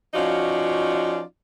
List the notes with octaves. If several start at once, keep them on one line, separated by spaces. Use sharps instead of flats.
F3 C#4 D#4 F4 F#4 D5